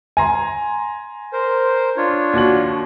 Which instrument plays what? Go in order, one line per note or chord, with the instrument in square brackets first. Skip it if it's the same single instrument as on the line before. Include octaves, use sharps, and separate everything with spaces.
[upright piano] G#5 A#5 C6
[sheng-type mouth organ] A#4 C5
D4 F4 C#5
[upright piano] D#2 F#4 F#7